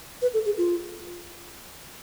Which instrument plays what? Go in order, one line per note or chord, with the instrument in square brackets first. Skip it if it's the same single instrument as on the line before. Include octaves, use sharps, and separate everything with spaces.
[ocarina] B4
A4
G#4
F4